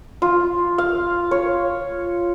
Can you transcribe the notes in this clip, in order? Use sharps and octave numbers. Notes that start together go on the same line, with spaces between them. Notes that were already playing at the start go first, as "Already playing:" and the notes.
F4
F5
C#5